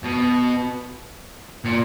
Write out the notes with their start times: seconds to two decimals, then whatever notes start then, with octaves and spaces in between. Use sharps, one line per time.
0.04 B2
1.65 A#2